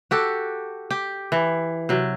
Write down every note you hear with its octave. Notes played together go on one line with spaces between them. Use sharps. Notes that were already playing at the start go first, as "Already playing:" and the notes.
F#4 G4 A4
G4
E3
C3 F#3